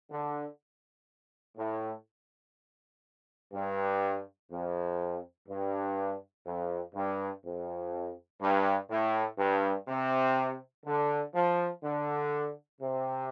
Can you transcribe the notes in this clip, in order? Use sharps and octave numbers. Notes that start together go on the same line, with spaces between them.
D3
A2
G2
F2
G2
F2
G2
F2
G2
A2
G2
C3
D3
F3
D3
C3